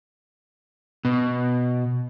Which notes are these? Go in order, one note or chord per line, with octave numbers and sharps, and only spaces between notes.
B2